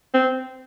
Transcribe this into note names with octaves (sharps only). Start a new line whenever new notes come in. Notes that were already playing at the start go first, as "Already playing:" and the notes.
C4